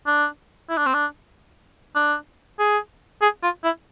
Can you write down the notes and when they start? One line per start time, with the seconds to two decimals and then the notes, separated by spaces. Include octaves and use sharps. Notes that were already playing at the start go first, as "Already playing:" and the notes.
0.07 D4
0.70 E4
0.78 D4
0.86 C4
0.94 D4
1.96 D4
2.59 G#4
3.22 G#4
3.43 F4
3.64 E4